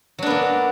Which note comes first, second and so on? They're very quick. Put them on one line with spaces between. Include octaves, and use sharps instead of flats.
F#3 D4 B3 A#3